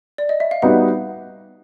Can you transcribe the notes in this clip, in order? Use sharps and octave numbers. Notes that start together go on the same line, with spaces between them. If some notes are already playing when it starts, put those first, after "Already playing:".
D5
D#5
E5
F5
G3 B3 D#4 F#4 B4 F#5